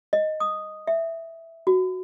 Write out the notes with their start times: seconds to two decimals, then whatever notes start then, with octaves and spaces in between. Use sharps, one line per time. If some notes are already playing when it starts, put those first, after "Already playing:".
0.13 D#5
0.40 D#6
0.87 E5
1.67 F#4